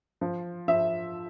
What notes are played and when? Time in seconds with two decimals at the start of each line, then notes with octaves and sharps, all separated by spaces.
0.21 F3
0.68 F3 E5